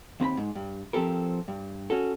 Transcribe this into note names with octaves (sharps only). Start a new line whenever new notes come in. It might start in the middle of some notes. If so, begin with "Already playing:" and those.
D#2 C4 A#5 B5
G#2
G2
F3 C4 G4 A4 A#4
G2
C#4 F#4 A4